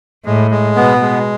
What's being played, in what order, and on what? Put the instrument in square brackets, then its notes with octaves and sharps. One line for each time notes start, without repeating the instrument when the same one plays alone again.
[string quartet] A2 [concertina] G#3
[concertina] G#3
[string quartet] B2 [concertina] B3
[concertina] G#3